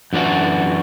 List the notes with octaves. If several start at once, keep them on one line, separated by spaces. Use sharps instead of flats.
F#2 E3 D4 F#4